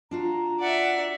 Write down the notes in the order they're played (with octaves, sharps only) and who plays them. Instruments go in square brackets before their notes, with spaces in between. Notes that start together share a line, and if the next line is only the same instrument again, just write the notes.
[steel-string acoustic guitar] D4 F4 F#4 [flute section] A#5
[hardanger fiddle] D5 E5 [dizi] F#5